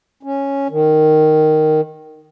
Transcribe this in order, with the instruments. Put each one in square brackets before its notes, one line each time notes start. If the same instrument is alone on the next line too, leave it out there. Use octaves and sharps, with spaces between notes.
[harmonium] C#4
D#3